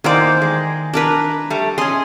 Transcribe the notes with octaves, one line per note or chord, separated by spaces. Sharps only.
E2 D#3 A#3 C5 D5
G#3
D4 A#4 B4
G3 A3
C#4 G#4 D#5 C6